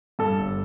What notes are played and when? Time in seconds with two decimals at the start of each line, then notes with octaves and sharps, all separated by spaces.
0.19 G2 A4
0.38 G1